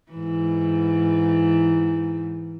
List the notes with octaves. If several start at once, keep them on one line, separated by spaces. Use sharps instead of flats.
G#2 E3